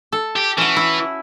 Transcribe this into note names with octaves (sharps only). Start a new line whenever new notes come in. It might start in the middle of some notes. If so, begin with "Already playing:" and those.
A4
G4
E3 C#4 F#4
E4